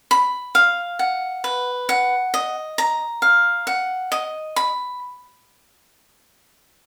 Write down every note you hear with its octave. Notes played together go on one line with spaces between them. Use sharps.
B5
F5
F#5
B4
F#5
D#5
A#5
F5
F#5
D#5
B5